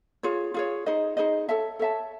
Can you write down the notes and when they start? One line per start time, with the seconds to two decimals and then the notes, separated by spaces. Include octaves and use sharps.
0.23 F4 G#4 C#5
0.54 F4 G#4 C#5
0.86 D#4 G#4 C5 D#5
1.17 D#4 G#4 C5 D#5
1.49 A4 C#5 E5 A5
1.79 A4 C#5 E5 A5